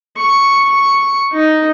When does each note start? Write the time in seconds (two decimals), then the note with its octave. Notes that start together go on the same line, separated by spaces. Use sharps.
0.17 C#6
1.33 D#4